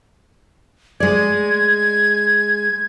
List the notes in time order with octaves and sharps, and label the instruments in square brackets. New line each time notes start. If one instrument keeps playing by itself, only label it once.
[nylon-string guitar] G#3 D5 [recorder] G#6